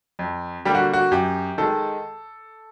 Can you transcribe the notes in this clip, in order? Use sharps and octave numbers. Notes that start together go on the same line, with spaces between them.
F2
D3 G3 A#3 G4
F#4
F#4
F#2 G4
D#3 G#3 A4